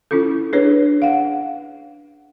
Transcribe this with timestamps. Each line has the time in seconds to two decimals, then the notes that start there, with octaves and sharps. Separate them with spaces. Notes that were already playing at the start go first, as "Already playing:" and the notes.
0.11 C#4 E4 F4 A4
0.53 D4 G#4 B4 C#5
1.02 F5 F#5